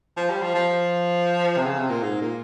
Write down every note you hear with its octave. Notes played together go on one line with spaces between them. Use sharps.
F3
G3
F3
F3
C3
C#3
C3
A#2
G#2
A#2